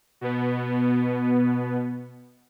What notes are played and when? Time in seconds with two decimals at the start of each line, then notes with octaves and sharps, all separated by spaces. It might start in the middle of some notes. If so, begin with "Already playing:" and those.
0.21 B2 B3